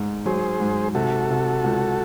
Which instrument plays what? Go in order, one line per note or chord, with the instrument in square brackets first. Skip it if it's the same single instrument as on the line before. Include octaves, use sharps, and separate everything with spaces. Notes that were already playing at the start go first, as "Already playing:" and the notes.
Already playing: [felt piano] G#2 D#4
[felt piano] F#3 [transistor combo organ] G#4 C5
[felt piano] G#2
[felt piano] C3 [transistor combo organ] F#4 A4
[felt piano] C3
C#2